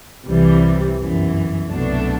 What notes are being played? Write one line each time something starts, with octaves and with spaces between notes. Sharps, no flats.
C2 C3 E3 G3
G1 F#2 E3
C2 B2 F#3 A3 D4